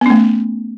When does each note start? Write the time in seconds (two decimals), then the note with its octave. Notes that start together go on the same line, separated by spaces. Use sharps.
0.01 B3
0.06 C#4
0.10 A3